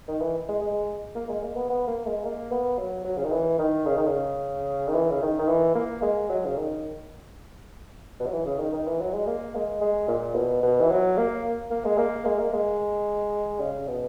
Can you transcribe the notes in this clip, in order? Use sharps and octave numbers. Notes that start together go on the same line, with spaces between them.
D#3
E3
G#3
G#3
A#3
G#3
A#3
B3
B3
A#3
G#3
A#3
B3
F#3
F#3
C#3
D#3
E3
D#3
C#3
D#3
C#3
D#3
E3
C#3
D#3
D#3
E3
A#3
G#3
F#3
C#3
D#3
B2
F#3
E3
C#3
D#3
D#3
E3
F#3
G#3
A#3
G#3
G#3
A#2
B2
B2
E3
F#3
A#3
A#3
G#3
A#3
G#3
A#3
G#3
C#3
B2